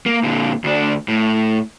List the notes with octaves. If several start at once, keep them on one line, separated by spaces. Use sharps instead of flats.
A#3
A#2 D3
D2 D4
A2